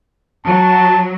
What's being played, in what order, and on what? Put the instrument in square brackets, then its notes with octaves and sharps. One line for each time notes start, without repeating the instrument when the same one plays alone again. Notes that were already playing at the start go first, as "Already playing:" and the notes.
[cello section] F#3 [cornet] A5